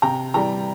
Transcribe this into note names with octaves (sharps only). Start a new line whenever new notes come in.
C3 G5 A#5
E3 G3 G5 A#5